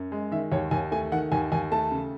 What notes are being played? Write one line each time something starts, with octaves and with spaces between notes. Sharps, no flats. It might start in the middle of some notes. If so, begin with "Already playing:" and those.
Already playing: F#2
G#3
D#3 E5
D#2 C#5
D#2 G#5
A3 G#5
D#3 F#5
D#2 G#5
D#2 G#5
A3 A5
C#3